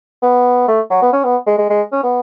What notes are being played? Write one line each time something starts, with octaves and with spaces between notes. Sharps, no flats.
B3
A3
F#3
B3
C#4
B3
G#3
G#3
G#3
C#4
B3